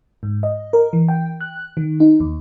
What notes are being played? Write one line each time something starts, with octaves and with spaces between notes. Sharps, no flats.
G#2
D#5
A#4
E3
G5
F#6
D#3
D#4
D#2